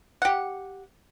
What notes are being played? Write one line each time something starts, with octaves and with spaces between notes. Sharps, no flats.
G4 F#5